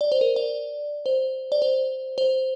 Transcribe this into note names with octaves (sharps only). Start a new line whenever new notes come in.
D5
C5
A#4
D5
C5
D5
C5
C5